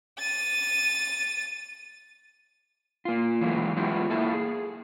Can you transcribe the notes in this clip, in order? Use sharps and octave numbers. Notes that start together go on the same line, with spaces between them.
A6 D#7
A#3 F4
E3 F#3 G#3 A3
F#3 G#3 B3 E4 F4 G4
A#3 E4 A4 E5 A5
G#4